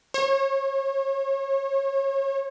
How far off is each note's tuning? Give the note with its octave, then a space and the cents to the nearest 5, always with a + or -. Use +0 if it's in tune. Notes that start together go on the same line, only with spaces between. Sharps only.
C#5 -35